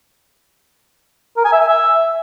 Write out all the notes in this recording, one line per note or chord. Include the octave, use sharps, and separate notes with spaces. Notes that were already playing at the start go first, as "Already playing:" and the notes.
A#4
G#5
E5
G#5
E5